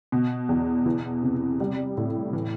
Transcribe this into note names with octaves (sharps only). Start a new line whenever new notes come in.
B2
E2
E3
C3
G3
A2
E3